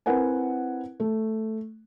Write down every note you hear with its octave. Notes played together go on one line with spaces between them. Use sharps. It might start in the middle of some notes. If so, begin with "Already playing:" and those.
C4 E4 A#4 B4 F#5 G#5
A3